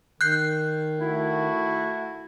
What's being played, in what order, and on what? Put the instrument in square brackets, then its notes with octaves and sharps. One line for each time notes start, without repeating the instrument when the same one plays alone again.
[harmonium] D#3 [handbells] F#6 G6 C7
[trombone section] A3 F#4 [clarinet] E4